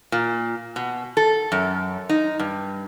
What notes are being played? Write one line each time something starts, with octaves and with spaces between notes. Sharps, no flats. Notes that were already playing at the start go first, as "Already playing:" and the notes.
A#2
B2
A4
F#2
D#4
G2